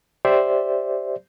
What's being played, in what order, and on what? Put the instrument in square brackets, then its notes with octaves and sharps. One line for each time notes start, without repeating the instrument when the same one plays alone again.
[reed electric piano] G4 C5 D5 E5